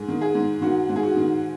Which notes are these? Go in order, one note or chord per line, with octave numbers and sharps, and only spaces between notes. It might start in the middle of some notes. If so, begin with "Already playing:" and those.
Already playing: G#2 G#4
D#3
G#4
G#2
D#3 F#4
G#2
G#4
F#4
D#3